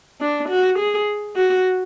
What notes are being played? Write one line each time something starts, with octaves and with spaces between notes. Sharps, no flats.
D4
F#4
G#4
F#4